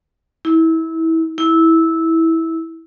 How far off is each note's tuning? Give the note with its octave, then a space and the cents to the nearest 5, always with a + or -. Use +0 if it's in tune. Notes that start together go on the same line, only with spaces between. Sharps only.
E4 -25
E4 -15